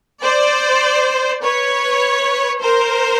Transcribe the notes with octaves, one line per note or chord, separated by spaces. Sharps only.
C5 D5
B4 C#5
A#4 C5